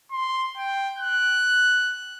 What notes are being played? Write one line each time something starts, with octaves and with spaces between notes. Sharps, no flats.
C6
G5
F#6